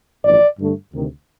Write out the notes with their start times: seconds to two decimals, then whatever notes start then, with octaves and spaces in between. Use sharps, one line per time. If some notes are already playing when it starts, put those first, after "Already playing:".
0.23 A1 G2 F3 D5
0.58 G2 D3 A3
0.94 D2 C3 D#3